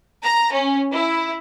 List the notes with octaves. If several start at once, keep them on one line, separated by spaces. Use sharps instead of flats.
A#5
C#4
E4